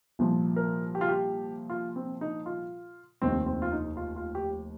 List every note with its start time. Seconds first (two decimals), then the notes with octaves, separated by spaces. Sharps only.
0.19 C2 A#2 F3
0.56 A#4
0.95 G4
1.01 F4
1.09 G4
1.70 F4
1.96 C4
2.21 D#4
2.46 F4
3.22 F1 D#2 D#3 C4
3.46 C4
3.62 F4
3.72 D#4
3.97 F4
4.16 F4
4.35 G4